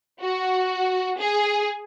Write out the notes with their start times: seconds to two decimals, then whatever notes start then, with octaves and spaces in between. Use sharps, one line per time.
0.20 F#4
1.19 G#4